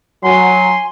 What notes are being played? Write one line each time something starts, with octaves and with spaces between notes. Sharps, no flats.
F#3 G#5 C6